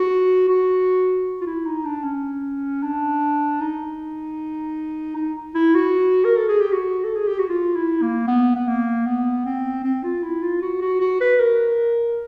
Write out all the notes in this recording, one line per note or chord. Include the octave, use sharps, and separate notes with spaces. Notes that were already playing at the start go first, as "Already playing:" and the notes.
Already playing: F#4
F#4
F4
E4
D#4
D4
C#4
D4
D#4
D#4
E4
F#4
A#4
A4
G#4
G4
F#4
A4
G#4
G4
F#4
F4
E4
A#3
B3
B3
A#3
B3
C4
C4
F4
E4
F4
F#4
F#4
F#4
B4
A#4